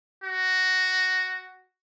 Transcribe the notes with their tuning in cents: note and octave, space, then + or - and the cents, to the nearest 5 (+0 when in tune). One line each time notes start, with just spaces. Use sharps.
F#4 +5